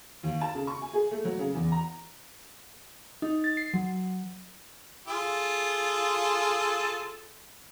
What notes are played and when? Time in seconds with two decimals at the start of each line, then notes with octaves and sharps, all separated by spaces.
0.23 D#2
0.41 A5
0.55 C#3
0.67 C#6
0.82 G#5
0.93 G#4
1.11 A3
1.25 F#3
1.40 C#3
1.54 E2
1.72 A#5
3.22 D#4
3.44 A6
3.57 C7
3.74 F#3
5.08 F4 G#4 A4